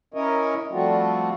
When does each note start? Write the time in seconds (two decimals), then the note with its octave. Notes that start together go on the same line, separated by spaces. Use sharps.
0.14 C#4 E4 A#4 C#5 D#5
0.72 F3 G3 A3 C4 F4 F#4